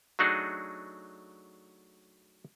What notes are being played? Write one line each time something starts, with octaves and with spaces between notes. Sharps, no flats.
F#3 A3 D4 D#4 F#4 G#4